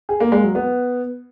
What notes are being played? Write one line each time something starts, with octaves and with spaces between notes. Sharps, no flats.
G#4
A#3
G#3
F#3
B3